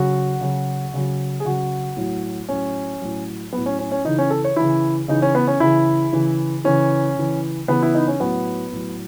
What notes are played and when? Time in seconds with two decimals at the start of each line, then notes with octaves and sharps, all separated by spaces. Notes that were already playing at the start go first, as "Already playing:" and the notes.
Already playing: C#3 F#3 F#4
0.41 C#3 F#3
0.94 C#3 F#3
1.40 G#4
1.45 C#3 F#3 F#4
1.97 A2 F#3
2.49 A2 F#3 C#4
3.01 A2 F#3
3.52 F#3 B3
3.57 A2
3.66 C#4
3.79 C#4
3.92 C#4
4.05 C#3 E3 D#4
4.18 C#4
4.30 A4
4.44 C#5
4.56 C#3 E3 E4
5.08 C#3 E3 D#4
5.22 C#4
5.35 B3
5.48 C#4
5.60 C#3 E3 E4
6.12 C#3 E3
6.64 C#3 E3 C#4
7.17 C#3 E3
7.68 C#3 E3 B3
7.83 E4
7.94 D#4
8.08 C#4
8.20 A2 F#3 B3
8.72 A2 F#3